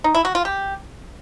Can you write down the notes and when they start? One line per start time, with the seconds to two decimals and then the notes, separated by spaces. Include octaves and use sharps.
0.04 D#4
0.15 E4
0.25 F#4
0.35 F4
0.45 G4